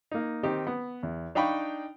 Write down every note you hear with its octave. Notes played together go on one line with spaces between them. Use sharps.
A#3 D#4
D#3 C4 D#4 G4
B3
E2
D4 D#4 F5 G5 B5 C#6